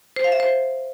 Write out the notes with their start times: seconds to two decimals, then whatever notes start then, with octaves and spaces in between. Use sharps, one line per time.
0.16 C5
0.24 F5
0.32 E5
0.40 C5